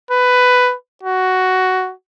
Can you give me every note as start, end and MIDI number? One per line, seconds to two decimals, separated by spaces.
0.11 0.75 71
1.03 1.93 66